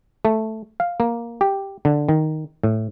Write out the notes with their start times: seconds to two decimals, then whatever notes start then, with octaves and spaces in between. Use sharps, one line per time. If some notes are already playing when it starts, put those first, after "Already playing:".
0.25 A3
0.80 F5
1.00 A#3
1.41 G4
1.85 D3
2.09 D#3
2.64 A2